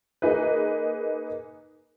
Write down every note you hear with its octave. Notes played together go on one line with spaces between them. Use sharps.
A#3 D#4 G#4 B4